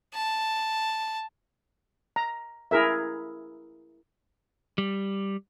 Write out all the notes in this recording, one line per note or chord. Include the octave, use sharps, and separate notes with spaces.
A5
A#5
E4 G#4 A#4 E5
G3